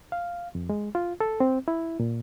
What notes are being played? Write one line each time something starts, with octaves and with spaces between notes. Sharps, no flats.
F5
F2
G#3
F4
A4
C4
E4
A#2